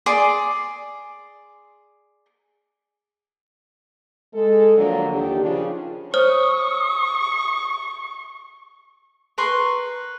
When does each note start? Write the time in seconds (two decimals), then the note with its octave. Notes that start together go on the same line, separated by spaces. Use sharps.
0.06 G#4 D5 C6
4.34 G#3 A4
4.76 D3 F3 F#3 A#3 D4
5.11 D#2 D#3 D4 G4
5.42 C#3 F3 D4 F4
6.14 C5 C#5 C#6 D#6 F6
9.38 A#4 B4 C6 C#6